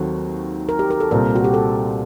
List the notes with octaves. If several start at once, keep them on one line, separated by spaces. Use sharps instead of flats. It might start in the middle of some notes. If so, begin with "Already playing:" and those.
Already playing: D#2 D#3 F#3 C4 F#4 A4
A#4
G4
A#4
A4
C2 A#2 G3 C4 A#4
F#4
G4
A4